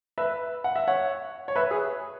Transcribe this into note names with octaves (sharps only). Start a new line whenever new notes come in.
B4 E5
F#5
E5
C#5 F#5
C#5
B4 E5
G#4 C#5